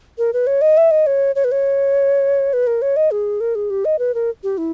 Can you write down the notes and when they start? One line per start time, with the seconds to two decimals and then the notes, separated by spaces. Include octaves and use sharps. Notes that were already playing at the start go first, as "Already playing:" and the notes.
0.18 A#4
0.33 B4
0.47 C#5
0.61 D#5
0.77 E5
0.91 D#5
1.07 C#5
1.35 C#5
1.44 B4
1.52 C#5
2.53 B4
2.67 A#4
2.82 C#5
2.96 D#5
3.11 G#4
3.41 A#4
3.55 G#4
3.70 G4
3.85 D#5
3.99 B4
4.15 A#4
4.43 G4
4.58 E4